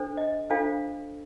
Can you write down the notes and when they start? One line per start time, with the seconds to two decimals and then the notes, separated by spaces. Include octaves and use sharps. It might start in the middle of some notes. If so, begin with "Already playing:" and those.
Already playing: D4 A4 C5
0.17 D#5
0.50 D4 F4 A4 C5 F5